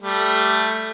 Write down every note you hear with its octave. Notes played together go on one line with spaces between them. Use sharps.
G3 A3